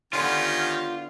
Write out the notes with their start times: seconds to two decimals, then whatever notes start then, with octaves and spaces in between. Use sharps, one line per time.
0.13 D3 D#3 B3 C#4 F4 G4